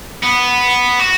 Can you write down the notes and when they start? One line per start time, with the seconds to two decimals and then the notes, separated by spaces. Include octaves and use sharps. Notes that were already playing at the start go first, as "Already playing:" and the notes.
0.23 B3
1.00 F#4